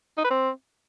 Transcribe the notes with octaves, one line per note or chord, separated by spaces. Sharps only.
D#4
B4
C4